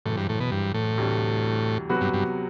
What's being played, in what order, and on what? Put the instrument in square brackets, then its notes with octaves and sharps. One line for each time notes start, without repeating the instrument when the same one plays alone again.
[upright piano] F#1 F#2 E3 [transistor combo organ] A2
[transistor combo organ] G2
A2
B2
G2
A2
[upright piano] D2 C3 E3 G3
C3 F#3 B3 F#4 B4
[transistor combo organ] G2
G2